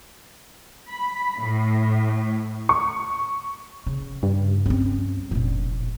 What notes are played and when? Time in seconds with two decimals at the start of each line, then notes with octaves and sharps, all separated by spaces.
0.90 B5
1.40 A2
2.69 C#6
3.86 C#3
4.23 G2
4.66 C4 C#4
5.31 F1 A#1 A#2